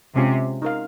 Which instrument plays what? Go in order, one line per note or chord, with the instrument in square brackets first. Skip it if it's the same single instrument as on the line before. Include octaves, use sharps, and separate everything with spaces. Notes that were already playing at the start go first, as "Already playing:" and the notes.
[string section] C3 [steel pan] G#3 C#4 F4
[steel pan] D#4 A#4 F5